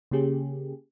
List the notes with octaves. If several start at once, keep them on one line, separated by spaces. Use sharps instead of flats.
C#3 A#3 C#4 G4 G#4